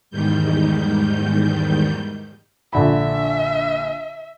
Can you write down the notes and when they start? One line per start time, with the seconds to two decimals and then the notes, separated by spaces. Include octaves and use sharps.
0.10 E2 G#2 D#3 G3 G6
2.73 A#1 D3 E5 B5